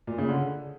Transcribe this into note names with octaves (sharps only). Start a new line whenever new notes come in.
A#2
C#3
D3